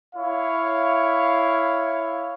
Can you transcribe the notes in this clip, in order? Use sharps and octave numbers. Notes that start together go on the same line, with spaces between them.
E4 C#5 F5